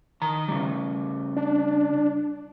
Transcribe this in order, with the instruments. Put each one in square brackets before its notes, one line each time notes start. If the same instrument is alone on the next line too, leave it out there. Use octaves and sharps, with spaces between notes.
[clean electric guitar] D#3 A#5
C#3 G3
[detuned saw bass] D4